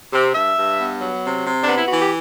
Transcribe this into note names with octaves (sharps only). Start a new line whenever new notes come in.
C3
G2 E5
G2
B3
F#3
C3
C3
D4
B3
E4
E3 F#4
G4